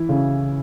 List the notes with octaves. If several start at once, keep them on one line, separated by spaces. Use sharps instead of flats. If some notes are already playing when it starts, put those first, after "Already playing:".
Already playing: E3 E4
C#3